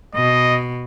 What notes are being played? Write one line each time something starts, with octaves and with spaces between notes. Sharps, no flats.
B2 D#5